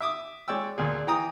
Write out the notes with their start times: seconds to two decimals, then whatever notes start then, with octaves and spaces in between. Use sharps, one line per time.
0.01 E5 D6 D#6
0.48 G#3 C#5 D5 G5 E6
0.78 D2 A#2 G#4
1.07 E3 G5 A#5 D#6